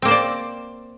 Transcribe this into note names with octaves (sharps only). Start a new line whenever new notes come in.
A#3 C4 C5 D5